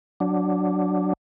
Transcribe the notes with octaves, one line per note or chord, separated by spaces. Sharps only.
F#3 D4